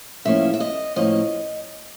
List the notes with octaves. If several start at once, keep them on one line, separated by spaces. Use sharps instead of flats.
A2 F3 A#3 C#4 E5
E5
D#5
A2 F3 A#3 C#4 D#5